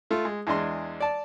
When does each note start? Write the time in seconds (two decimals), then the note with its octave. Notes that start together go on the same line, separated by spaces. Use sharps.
0.11 A3 F4
0.25 G#3
0.47 E2 G#3 D4 D#5 C6
1.00 D5 A5